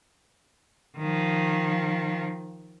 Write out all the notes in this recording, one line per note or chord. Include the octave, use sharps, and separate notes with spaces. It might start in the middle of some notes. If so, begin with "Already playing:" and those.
D#3 F3